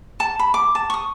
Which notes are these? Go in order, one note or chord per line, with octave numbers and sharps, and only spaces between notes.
A5
B5
D6
A5
C#6 D#6